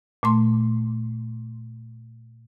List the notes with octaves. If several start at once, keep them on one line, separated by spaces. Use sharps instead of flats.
A#2 A3 C6